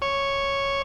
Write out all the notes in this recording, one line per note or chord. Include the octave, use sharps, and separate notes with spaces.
C#5